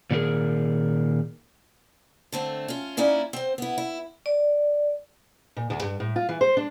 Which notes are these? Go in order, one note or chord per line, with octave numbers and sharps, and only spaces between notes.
A#2 D#3 F#3 A3 G#4 A#4
D3 A3 C4
C#4 F4
A#3 C#4 D#4 E4 D5
C4 C5
B3 E4
E4
D5
A#2
D2
G2
A2
F4
E3
C5
D4